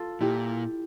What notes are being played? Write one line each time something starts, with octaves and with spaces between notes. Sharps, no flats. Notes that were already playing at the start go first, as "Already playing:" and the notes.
Already playing: F4 A4
A#2 E4 G4